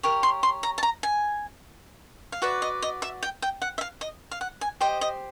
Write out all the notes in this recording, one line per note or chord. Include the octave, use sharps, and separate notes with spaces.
G4 A#4 C#5
C6
C6
A#5
A5
A#5
G#5
F5
F#4 B4 D5 E5
D#5
D#5
E5
G5
G5
F#5
E5
F5
D#5
F5
F#5
G#5
G4 C5 D#5 G5
D#5